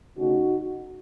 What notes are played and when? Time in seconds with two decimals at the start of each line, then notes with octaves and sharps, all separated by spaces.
0.17 C#3 A3 C#4 D#4 F#4